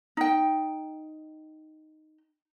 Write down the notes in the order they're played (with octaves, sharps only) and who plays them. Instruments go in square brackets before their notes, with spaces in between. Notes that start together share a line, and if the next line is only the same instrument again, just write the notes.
[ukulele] D#4 G5